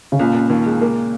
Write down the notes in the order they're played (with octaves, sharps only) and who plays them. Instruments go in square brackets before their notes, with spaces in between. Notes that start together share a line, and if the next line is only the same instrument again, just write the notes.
[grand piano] C#3
[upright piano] C#2 [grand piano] A#2
[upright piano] C#2
D#2
G#3
A#3